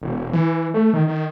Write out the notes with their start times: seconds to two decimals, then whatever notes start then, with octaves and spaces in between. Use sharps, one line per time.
0.02 E1
0.14 E1
0.33 E3
0.74 A3
0.93 D#3
1.08 D#3